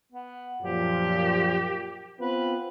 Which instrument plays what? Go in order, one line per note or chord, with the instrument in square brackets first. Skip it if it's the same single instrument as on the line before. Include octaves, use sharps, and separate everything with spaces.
[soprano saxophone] B3
[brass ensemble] F#2 A#2 F3 [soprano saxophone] G4
[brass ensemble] B3 C4 F4 [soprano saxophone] B4